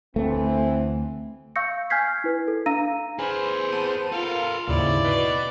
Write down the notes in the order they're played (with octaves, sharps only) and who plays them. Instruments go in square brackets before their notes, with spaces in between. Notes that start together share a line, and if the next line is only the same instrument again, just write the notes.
[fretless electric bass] D2 A3 [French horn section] E3 B3 C4
[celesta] F5 C#6 E6 G6 A#6 C#7
G#5 F6 G6 G#6 B6 C7
E4 B4
A4
D4 F5 A#5 E6 A#6 D#7
[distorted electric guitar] G#4 B4 [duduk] C5 [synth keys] G#5
[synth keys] B3 A5 D#7
[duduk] F4 [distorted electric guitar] A4 A#4 [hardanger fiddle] F5
[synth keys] D#2 G#2 [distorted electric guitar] C#3 [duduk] E4 [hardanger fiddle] D5
[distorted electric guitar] B2 D#5 [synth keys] B4